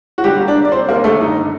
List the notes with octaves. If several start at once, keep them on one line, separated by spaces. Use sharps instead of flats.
F#4
D3 G3 G4
A#3
D4 D5
G3
D5
A#3 C4 C5
D#2 A#3 A#4
D3 A3 A4
G2 D#4
D3